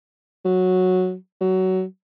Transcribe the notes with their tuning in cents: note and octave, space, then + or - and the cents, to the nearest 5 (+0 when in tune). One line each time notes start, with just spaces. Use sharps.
F#3 -5
F#3 +20